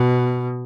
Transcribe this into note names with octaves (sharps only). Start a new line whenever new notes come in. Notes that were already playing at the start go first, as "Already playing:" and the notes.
Already playing: B2